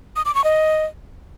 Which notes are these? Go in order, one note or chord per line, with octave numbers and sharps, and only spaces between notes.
D#6
D6
C#6
D#5